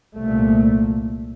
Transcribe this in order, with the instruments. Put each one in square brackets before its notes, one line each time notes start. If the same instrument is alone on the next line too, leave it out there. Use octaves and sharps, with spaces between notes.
[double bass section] C2 A#2 A3